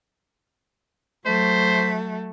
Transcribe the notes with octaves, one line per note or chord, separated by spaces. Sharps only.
F#3 A3 C5 B6